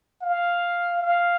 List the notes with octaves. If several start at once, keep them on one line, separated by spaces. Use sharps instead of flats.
F5
F5